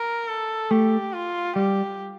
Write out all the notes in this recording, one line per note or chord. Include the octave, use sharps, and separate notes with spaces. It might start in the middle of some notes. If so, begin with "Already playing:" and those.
Already playing: A#4
A4
A3 G4
F4
G3 G4